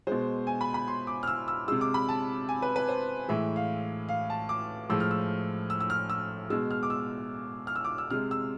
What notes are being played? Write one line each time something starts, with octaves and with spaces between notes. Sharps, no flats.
B2 G#3 C5
G#5
B5
B5
C6
D6
F6
E6
E6
C3 G#3 E6
D6
B5
A5
G#5
B4
B4
C5
A2 E3 G#3 E5
F5
F5
A5
D6
A2 F3 G#3 E6
F6
E6
E6
E6
F6
E6
B2 G#3 E6
F6
D6
E6
F6
E6
D6
E6
C3 G#3 F6
E6